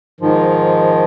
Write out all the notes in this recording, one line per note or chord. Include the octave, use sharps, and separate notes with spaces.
G#2 D#3 F3